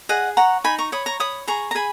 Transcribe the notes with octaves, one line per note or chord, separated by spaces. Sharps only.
G#4 D#5 F#5
C#5 F#5 A#5
D#4 G#5 B5
A#5 C#6
C#5 B5 D#6
A#5 C#6
C#5 B5 D#6
G#4 A#5 C#6
A#5
G#4 G#5 B5